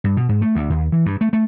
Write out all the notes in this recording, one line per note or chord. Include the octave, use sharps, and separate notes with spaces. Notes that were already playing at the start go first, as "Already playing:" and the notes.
G2
B2
G#2
A3
D2
D#2
E3
G2
A3
A3